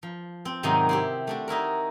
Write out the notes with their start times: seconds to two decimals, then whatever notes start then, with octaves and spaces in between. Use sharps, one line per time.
0.03 F3
0.45 C4
0.63 G#2 C3 D#3 F#3 C4 D#4
0.89 C4 E4 G4
1.27 A3 D4 F#4
1.48 D#4 E4 F#4 A#4